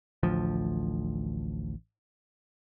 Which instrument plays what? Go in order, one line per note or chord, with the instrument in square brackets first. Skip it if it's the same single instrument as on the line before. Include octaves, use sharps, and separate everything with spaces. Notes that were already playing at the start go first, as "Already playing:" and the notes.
[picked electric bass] A1 D2 F3